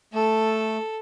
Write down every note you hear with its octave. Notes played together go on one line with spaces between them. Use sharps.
A3 A4